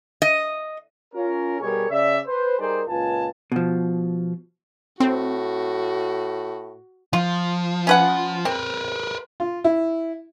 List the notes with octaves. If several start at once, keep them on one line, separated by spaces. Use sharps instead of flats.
D#5
C#4 F4 A#4
B2 G3 G#4 A#4 C#5
C#3 D5 E5
B4 C5
G3 D#4 G#4 A#4 C5 D5
C#2 A#2 F4 B4 G#5 A5
B2 F3
A2 C4 F#4
F3 F4
C#4 B4 F#5
C4 A#4 B4
F4
E4